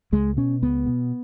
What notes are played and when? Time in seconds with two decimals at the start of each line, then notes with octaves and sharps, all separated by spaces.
0.12 C#2 G#3
0.37 B2 C#4
0.62 C#2 B3
0.86 B2